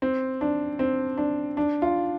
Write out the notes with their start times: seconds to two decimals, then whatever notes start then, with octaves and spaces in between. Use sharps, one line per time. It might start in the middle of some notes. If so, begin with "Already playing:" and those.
0.02 C4
0.41 D4
0.79 C4
1.17 D4
1.57 D4
1.82 F4